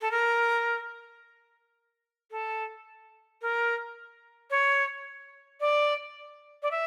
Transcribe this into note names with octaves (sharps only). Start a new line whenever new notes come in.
A4
A#4
A4
A#4
C#5
D5
D5
E5